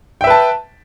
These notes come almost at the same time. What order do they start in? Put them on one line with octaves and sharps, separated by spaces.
G5 E5 B4 A5